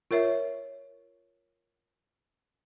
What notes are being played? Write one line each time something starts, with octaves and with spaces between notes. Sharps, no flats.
F4 A#4 C#5 E5